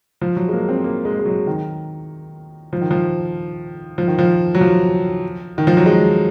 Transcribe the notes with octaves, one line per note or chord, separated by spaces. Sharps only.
F3
F#3
G#3
A#3
C4
A#3
G#3
G#3
F#3
D#3
F3
D#3
F3
F3
D#3
F3
F#3
F3
D#3
F3
F#3
G#3